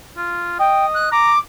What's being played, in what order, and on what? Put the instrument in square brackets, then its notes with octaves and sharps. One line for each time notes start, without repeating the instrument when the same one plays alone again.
[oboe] F4
[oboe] D#5 [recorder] G5
[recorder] F#6
[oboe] A#5 [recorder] D6